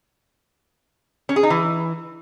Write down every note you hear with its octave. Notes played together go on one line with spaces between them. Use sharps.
C#4
G#4
D#4
E3